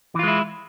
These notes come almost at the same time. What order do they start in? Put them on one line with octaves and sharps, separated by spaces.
E3 F4 G#3 E4